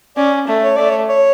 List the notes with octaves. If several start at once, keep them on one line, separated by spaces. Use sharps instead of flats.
C#4 D5
A3
C#5
A3 D5
C#5
C#5